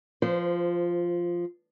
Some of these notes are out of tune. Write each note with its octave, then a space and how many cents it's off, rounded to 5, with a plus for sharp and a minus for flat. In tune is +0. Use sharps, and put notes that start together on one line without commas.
F3 -5 C5 -20